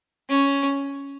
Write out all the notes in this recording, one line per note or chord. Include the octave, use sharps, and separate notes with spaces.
C#4